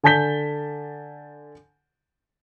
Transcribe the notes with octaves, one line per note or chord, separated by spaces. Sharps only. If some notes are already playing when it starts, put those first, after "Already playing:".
D3 G#5 A5 G6 B6 G7